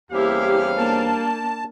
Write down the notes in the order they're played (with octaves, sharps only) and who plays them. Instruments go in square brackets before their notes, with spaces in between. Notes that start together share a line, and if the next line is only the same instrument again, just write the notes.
[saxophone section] E2 C#4 C5 [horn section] G3 F5 [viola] A#3 E4 [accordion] G4
[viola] A#3 D4 [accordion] A5